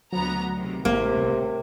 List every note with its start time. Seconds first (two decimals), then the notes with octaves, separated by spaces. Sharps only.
0.13 D2 F#3 B3 A#5
0.56 C#2 C3 D#3
0.85 A1 A2 C3 A#3
1.17 C2